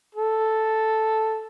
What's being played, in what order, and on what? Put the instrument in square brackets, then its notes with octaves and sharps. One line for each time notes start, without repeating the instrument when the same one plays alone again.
[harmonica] A4